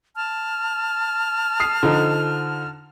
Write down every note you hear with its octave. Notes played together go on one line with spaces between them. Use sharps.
A5 F6
D#6 C7
D3 F3 D#4